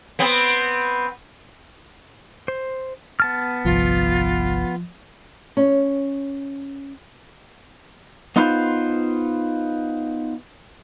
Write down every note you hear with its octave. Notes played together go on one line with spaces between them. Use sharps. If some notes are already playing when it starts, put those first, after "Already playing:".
B3 C4
C5
B3 A5 F6
G1 C2 F3 F4
C#4
B3 D#4 F4 B4 C5